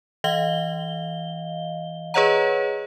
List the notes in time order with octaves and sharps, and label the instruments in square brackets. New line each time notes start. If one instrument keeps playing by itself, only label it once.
[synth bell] E3 D#5 F5 G7
G#4 B4 C#5 D#5 F#5 A#5